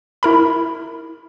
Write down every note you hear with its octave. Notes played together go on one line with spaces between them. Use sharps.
E4 A#4 B5